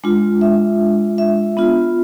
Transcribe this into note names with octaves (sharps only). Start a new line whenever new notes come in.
G#3 D4 F4
E5
E5
B3 D4 F4